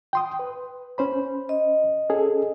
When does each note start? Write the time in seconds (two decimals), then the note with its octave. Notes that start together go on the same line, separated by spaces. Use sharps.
0.13 G5 C6 D#6
0.39 B4
0.98 C#4 C5 B5
1.49 D#5
2.10 C#4 G#4 A4